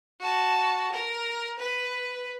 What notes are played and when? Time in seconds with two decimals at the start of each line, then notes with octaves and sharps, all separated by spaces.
0.20 F#4 A5
0.92 A#4
1.59 B4